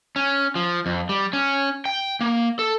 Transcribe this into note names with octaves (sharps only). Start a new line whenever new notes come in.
C#4
F3
F2
G3
C#4
G5
A#3
A4